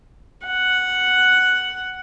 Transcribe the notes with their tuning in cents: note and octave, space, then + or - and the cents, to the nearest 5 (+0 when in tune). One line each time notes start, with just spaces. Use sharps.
F#5 +0